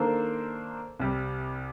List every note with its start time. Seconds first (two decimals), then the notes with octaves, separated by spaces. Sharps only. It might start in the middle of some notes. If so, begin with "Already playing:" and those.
Already playing: D#3 A#3 D4 A4 C5
1.00 C2 C3 G3